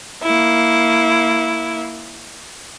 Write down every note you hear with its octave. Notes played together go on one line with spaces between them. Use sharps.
A#3 E4